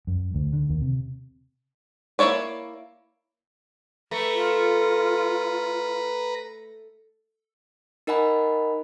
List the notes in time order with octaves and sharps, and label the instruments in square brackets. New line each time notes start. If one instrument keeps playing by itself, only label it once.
[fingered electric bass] F#2
D2
D3
D#2
C3
[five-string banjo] A#3 D#4 E4 C#5 D5
[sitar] A3 [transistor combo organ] B4 A#5
[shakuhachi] F4
[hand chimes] D#4 A#4 D#5 F#5 G#5 B5